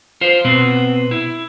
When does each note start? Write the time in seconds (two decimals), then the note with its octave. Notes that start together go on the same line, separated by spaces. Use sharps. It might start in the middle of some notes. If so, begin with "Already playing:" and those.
0.21 F4 C5
0.45 B2 B3 C4
1.11 E4